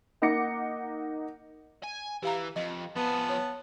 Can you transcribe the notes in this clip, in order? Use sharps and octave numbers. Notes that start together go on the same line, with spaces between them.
A#3 D#4 F#5 D6 A#6 C#7
G#5
E3 G4 F5 A#5
F2 D#5
F3 B3 G#4 A5
C#5